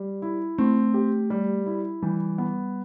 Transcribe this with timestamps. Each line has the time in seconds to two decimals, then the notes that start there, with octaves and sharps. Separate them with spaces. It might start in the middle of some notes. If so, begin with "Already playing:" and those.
Already playing: G3
0.22 E4
0.58 A3 C4
0.94 G4
1.30 G3
1.66 E4
2.03 E3 G3
2.38 B3